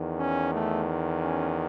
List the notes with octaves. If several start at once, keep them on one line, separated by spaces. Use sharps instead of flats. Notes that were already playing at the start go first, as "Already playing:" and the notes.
Already playing: E2 D#3
C#4
A3
C#4